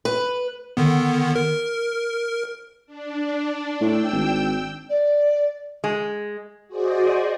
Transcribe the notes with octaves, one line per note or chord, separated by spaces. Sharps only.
B4
D3 D#3 B3
A#4
D4
A2 G5 E6
G#1
D5
G#3
F#4 G#4 C5 D5 D#5